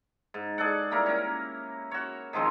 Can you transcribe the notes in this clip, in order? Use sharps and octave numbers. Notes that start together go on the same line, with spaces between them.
G#2
G#4 A4 D5 F#5
G3 A#3 E4 A#4
C#4 A#4
F#4 C#5
D#3 F3 G#3 C4